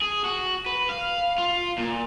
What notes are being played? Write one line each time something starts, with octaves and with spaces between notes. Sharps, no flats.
G#4
F#4
B4
F5
F4
A#2